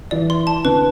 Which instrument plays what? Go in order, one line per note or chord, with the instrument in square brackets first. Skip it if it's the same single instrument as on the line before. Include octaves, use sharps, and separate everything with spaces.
[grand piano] E3 [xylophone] D5
[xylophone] C6
A5
[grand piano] D3 [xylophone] B4